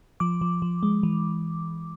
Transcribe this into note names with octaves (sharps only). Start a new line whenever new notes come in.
F3 D6
F3
F3
G#3
E3